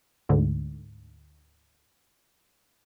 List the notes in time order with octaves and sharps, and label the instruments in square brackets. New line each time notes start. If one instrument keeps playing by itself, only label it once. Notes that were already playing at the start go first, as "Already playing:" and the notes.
[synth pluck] D2 G#2 D3